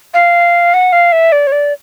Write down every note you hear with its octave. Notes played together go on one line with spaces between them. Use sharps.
F5
F#5
F5
E5
D5
C#5
D5